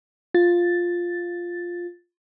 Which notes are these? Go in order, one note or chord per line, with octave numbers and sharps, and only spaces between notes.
F4 A6